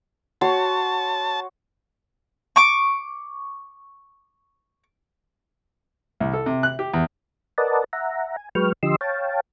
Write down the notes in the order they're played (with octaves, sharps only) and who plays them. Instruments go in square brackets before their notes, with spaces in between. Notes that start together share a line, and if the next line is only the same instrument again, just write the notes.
[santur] F#4 C#5 C6 [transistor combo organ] A5
[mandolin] C#6 D6
[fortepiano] C2
A4
C3
F#6
G4
E2
[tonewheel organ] A#4 B4 D5 D#5 F#5 A5
E5 F#5 A#5
G#5
F#3 G#3 B4 G5 C#6 F6
D3 F3 G4 D#5 C6 E6
C#5 F5 G5 A5